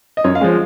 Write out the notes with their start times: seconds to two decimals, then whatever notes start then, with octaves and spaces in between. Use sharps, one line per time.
0.17 D#5
0.24 F#2 C#5
0.35 F5
0.41 F3 G#3